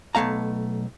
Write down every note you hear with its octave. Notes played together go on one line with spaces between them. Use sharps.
B1 F3 A3 F5 A#5